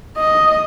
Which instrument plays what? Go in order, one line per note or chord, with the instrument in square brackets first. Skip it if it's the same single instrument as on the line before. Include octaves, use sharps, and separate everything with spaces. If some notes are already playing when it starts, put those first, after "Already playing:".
[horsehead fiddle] D#5